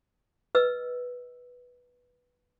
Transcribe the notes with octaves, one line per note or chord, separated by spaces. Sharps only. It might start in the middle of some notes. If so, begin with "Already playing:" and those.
B4 D#5 E6